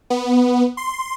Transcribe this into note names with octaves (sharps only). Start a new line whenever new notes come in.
B3
C6